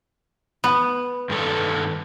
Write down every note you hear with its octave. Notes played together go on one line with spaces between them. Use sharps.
B3
G2 D#3 A4